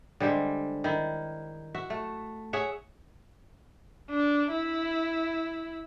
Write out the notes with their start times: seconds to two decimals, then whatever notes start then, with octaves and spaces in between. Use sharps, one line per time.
0.20 D3 G3 G#3 C5
0.84 D#3 E4
1.75 F#4 E5
1.90 A3
2.53 G#4 C#5 E5 F#5
4.10 D4
4.50 E4